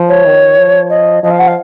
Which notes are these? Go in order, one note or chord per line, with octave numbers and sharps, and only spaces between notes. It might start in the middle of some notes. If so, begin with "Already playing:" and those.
Already playing: F3
C#5
D#3
F3
D#5
F3 D#5
F5
F#5
F5